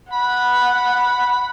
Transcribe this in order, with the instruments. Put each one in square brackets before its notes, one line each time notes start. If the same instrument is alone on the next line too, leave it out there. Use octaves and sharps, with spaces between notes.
[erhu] F#5 [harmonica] B5